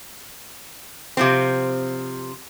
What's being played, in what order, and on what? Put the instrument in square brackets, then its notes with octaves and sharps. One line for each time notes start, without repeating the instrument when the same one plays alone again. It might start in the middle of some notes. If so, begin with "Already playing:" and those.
[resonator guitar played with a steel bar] C3 F3 C4